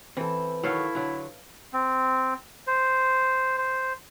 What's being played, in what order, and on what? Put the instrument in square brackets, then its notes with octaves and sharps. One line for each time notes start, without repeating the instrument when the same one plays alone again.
[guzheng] E3 [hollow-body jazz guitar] C4 A4
[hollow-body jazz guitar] D#3 F#3 [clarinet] E4 [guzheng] A4 C#5 F5
[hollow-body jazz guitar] D3 F#3
[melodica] C4
C5
C5